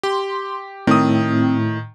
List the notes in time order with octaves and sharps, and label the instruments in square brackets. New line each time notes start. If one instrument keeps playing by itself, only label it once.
[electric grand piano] G4 [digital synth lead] C6
[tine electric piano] A2 [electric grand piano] D#3 D#6 [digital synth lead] C4